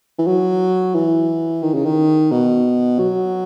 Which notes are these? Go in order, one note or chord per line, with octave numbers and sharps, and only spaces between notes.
E3
F#3
E3
D#3
C#3
D#3
B2
F#3